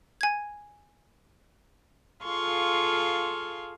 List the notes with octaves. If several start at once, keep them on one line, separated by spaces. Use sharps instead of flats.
G#5 G#6
F4 G#4 A4 F5 C6 C#6